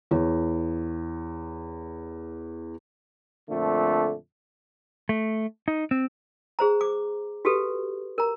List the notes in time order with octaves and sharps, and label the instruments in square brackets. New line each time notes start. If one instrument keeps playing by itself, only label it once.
[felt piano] E2 C#5
[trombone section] F2 A#2 D3 A3
[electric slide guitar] A3
D#4
C4
[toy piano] G#4 C5 A#5
D6
F#4 G4 A4 B4
A#4 A#5